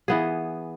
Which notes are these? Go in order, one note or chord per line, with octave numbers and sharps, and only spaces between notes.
E3 B3 G#4